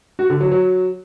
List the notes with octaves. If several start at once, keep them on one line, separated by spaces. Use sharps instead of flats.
F#4
D3
F#3
F#3